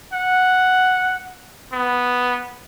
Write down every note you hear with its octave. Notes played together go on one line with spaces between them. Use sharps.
F#5
B3